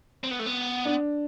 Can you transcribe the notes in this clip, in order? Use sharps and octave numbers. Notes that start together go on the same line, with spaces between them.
C4
B3
A3
B3
D4